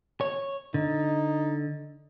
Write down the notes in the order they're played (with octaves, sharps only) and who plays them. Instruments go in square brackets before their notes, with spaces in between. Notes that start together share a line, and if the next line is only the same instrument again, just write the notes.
[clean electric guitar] C#5
[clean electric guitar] D3 [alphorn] D#4